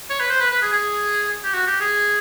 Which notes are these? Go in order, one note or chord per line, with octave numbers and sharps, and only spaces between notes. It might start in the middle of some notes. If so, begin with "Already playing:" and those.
C#5
B4
C5
B4
B4
G#4
G#4
G4
F#4
G4
G#4